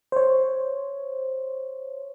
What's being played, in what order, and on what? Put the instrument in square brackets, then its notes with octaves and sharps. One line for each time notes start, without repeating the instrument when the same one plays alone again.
[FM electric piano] C5 C#5